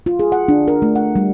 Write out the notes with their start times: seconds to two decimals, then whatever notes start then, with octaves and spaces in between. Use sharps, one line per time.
0.06 F4
0.20 G#4
0.32 F#5
0.48 D4
0.68 A#4
0.82 A3
0.96 F#5
1.16 G3